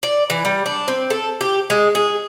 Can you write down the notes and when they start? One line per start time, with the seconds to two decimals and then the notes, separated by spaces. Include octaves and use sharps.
0.03 D5
0.30 E3
0.45 G3
0.66 D4
0.88 C4
1.10 A4
1.41 G4
1.70 G#3
1.95 G#4